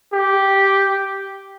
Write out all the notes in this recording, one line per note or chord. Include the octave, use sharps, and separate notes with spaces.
G4